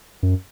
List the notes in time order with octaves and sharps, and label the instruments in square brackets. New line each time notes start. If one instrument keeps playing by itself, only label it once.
[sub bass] F#2